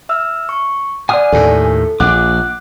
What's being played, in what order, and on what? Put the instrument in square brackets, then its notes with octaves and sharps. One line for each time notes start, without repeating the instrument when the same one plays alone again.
[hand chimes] E5 E6 F6
C#6
[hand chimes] D5 F#5 [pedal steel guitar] G#5 D#6 F6
[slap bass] D#2 A2 [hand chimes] A4
[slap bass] A#1 [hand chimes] F#5 F#6 [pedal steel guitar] D6